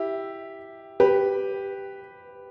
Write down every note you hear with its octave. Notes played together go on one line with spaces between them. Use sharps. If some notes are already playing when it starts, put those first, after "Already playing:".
Already playing: E4 G4
G4 B4